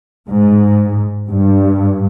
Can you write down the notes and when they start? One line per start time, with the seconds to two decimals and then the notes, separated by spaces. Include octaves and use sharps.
0.29 G#2
1.31 G2